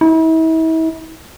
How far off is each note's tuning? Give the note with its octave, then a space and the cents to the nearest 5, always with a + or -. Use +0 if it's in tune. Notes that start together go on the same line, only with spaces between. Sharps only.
E4 -40